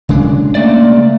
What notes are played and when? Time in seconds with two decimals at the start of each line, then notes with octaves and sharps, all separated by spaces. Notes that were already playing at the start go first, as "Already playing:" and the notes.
0.09 C#3 G#3 D4
0.55 A3 A#3 D5